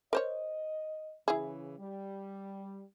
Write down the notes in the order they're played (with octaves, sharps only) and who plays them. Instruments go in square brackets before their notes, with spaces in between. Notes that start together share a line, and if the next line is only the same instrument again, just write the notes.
[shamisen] A#4 C5 C#5 [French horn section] D#5
[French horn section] C#3 E3 [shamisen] E4 G#4
[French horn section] G3